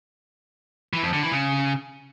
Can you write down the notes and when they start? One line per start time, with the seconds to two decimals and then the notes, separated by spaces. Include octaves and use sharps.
0.93 E3
1.03 F2
1.13 D3
1.23 E3
1.33 C#3